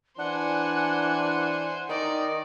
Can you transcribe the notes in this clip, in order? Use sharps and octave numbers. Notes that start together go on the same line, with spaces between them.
E3 D4 C5 F#5 G#5
D#3 D#4 D5